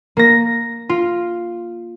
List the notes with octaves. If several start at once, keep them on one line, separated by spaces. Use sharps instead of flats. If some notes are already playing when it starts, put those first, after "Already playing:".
A#3 A#6
F4